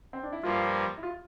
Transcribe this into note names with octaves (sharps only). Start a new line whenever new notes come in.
C4
D4
E4
G2 F3 A#3 F4
E4
F4